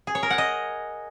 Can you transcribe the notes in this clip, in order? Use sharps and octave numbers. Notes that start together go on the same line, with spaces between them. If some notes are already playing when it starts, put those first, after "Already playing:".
G#4
C#5
A#4
F#5
D#5